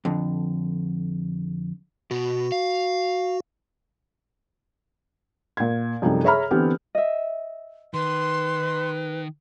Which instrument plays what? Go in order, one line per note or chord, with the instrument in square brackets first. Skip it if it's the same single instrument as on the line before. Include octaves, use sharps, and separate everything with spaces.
[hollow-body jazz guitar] F2 D3
[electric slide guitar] B2 [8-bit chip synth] F#4
[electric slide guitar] F5
[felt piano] A#2 G#6
F#2 C3 F3 G3 A3 D#4
G#4 C#5 E5 A#5 B5 F6
D3 E3 B3 C4 G4
[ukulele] D#5 E5
[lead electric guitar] D#3 [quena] B4 [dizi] C6